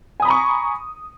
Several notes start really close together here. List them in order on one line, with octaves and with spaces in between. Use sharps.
G#5 D#6 B5 A#5 C#6